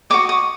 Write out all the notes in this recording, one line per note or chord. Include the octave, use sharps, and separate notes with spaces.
F#4 A#4 D#5 D6
D#6